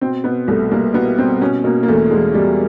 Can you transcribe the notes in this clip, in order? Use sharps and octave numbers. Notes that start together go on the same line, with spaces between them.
B2 C4
B2 B3
C2 A3
C2 A#3
B2 B3
B2 C4
B2 C#4
B2 A#3
A#3
E2 A3
E2 G#3
B2 G3